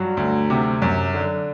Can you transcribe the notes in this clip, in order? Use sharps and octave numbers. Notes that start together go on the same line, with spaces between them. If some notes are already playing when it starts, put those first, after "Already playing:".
Already playing: G2 F#3
D2
C3
F#2
D3